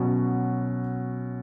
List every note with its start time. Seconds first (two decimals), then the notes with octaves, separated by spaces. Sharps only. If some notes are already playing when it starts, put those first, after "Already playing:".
Already playing: B2 F#3 C#4